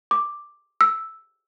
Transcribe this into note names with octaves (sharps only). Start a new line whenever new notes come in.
D6
E6